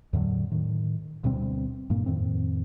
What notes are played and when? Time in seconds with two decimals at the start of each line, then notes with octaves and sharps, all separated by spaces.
0.13 E2 A2 D3 F#3
0.51 A2 D#3
1.24 D2 B2 G3 C4
1.90 G2 A#2 A#3
2.06 F2 A2 D#3 C4